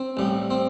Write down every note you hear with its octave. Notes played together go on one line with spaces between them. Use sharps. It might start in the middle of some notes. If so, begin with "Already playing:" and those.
Already playing: C4
A1 A2 G3
C4